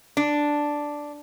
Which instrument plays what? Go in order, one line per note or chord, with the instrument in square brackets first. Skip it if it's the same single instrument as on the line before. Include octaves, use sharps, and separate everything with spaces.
[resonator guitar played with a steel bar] D4